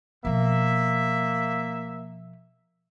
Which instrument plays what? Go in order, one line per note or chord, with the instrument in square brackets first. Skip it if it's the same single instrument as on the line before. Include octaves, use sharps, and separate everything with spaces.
[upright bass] B2 F3 [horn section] A#3 E5